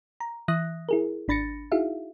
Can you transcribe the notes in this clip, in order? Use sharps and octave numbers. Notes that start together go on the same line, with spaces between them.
A#5
E3 E5 D#6 F#6 A#6
E4 G#4 A#4
G#1 D4 B5 A6 A#6 C#7
D#4 E4 F#4 G#4 E5 F5